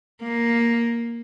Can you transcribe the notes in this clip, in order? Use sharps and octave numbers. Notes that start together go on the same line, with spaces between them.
A#3